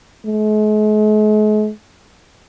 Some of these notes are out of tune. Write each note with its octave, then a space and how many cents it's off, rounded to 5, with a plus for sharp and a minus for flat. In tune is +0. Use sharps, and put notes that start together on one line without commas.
G#3 +45